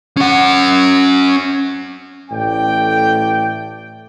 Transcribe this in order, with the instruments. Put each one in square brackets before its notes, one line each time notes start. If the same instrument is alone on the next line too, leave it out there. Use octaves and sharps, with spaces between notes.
[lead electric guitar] C#4 F#5
[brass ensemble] A1 A2 A3 D5 G5